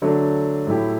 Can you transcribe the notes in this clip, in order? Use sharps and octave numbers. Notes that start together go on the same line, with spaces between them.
D3 F#3 A3 D4
A2 F#3 A3 E4 G4